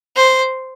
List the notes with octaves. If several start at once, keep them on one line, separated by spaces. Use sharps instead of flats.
C5